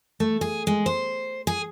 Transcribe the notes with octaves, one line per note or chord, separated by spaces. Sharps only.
A3
G#4
G#3
C5
G#4